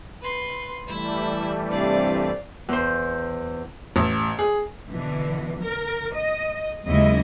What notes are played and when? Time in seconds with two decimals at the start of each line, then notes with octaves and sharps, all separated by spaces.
0.21 B4 C6
0.87 E3 G3 A3 E4 E5
1.70 G2 C3 D5 F5
2.68 E2 C5
3.96 A1
4.39 G#4
4.90 B2 D3 E3
5.60 A#4
6.14 D#5
6.86 D#2 C#3 F#3 G#3 E4 D#5